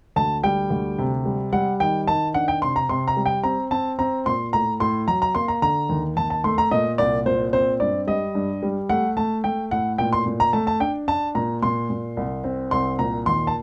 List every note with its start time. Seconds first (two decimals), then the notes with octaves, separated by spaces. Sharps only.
0.16 D2 A5
0.44 G3 G5
0.70 D2
0.98 C3
1.26 G3
1.53 G3 F#5
1.80 D#3 G5
2.07 D#3 A5
2.34 D4 F#5
2.48 G5
2.62 C3 C6
2.76 A#5
2.89 C3 C6
3.08 A#5
3.17 G3
3.26 G5
3.43 C4 A#5
3.71 C4 A5
3.99 C4 A#5
4.26 A#2 C6
4.53 A2 A#5
4.80 A2 C6
5.08 F#3 A#5
5.22 A#5
5.35 A#3 C6
5.48 A#5
5.62 D3 A#5
5.89 D#2
6.17 D#2 A5
6.30 A5
6.44 A3 C6
6.58 A#5
6.71 A#2 D#5
6.98 C2 D5
7.26 A#2 C5
7.53 C4 C5
7.80 G2 D5
8.07 G3 D#5
8.35 G2
8.62 G3
8.89 A3 F#5
9.17 A3 A5
9.44 A3 G5
9.71 A2 F#5
9.98 A#2 G5
10.13 C6
10.26 A#2
10.40 A#5
10.53 A3 A5
10.67 A5
10.80 D4 G5
11.08 D4 A5
11.35 A#2 A#5
11.63 A#2 C6
11.90 A#2
12.17 C2
12.44 C4
12.71 C2 C6
12.99 A#2 A#5
13.26 D#2 C6
13.47 A5